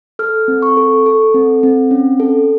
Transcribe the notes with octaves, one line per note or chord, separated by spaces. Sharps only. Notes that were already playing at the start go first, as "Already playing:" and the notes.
A4 F6
C4
C#6
A4
A4
C4
C4
C#4
A4